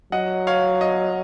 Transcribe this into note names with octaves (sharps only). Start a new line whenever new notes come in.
F#3 D#5 F#5
C#5 F5
D#5